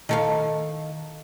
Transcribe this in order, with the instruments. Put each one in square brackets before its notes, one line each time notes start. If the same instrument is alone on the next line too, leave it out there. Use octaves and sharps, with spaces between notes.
[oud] D#3 A4 F5